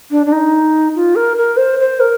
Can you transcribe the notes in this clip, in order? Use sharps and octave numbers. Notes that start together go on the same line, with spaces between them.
D4
D4
D#4
F4
A#4
A#4
C5
C5
A#4